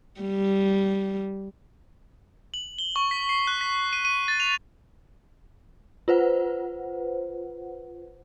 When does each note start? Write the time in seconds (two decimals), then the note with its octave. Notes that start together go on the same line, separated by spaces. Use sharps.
0.21 G3
2.54 F#7
2.78 G7
2.96 C#6
3.11 B6
3.29 C7
3.47 F#6
3.61 B6
3.93 D#7
4.05 D#7
4.28 A6
4.40 F7
6.08 F4 B4 C5 F#5